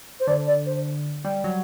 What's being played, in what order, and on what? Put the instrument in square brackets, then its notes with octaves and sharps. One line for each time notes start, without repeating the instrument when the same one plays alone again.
[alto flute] C5
[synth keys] D3 [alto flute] D5
[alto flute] D5
C5
[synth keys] G3
F#3